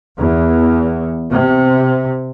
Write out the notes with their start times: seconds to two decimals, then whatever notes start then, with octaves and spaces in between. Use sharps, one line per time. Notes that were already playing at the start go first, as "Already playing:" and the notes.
0.17 E2
1.32 C3